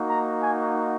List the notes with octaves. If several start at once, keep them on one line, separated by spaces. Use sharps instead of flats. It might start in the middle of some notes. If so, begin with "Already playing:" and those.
Already playing: A#3 D#4 F#4
A#5
G#5